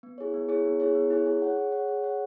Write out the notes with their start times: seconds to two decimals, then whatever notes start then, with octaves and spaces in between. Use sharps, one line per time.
0.03 B3
0.18 E4 G#4 C#5
0.34 B3
0.49 E4 G#4 C#5
0.65 B3
0.80 E4 G#4 C#5
0.95 B3
1.11 E4 G#4 C#5
1.26 G#4
1.42 C#5 F#5
1.56 G#4
1.72 C#5 F#5
1.88 G#4
2.03 C#5 F#5